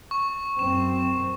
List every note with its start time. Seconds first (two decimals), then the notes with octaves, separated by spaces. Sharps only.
0.11 C#6
0.59 F#2 C4 E7